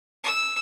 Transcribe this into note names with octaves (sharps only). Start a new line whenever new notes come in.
E6